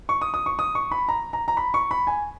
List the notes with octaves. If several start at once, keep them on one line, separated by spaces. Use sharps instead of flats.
C#6
D#6
D#6
C#6
D#6
C#6
B5
A#5
A#5
A#5
B5
C#6
B5
G#5